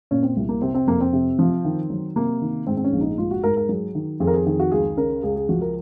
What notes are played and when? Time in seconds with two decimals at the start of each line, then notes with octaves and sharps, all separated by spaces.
0.11 A#2 C#4
0.23 C4
0.37 C2
0.49 A#3
0.62 C3 C4
0.74 C4
0.87 F2 A#3
1.01 C4
1.13 C3
1.39 F3
1.65 D#3
1.90 F#3
2.16 C3 A#3
2.42 D#3
2.67 G#2 C4
2.77 C4
2.84 C#4
2.93 A#1
3.01 D#4
3.18 G#2 F4
3.31 F#4
3.44 G#2 A#4
3.57 A#4
3.69 F#3 G#4
3.95 D#3
4.20 F2 G#4
4.27 A#4
4.34 G#4
4.46 D#3 G#4
4.60 F#4
4.72 C#2 G#4
4.97 C#3 A#4
5.23 C#2 G#4
5.36 G#4
5.49 F3 F#4
5.61 A#4